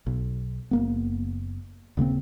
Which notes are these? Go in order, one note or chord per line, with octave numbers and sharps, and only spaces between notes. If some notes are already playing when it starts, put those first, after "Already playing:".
B1
F#1 A#3 B3
D#1 C#3 A#3 C4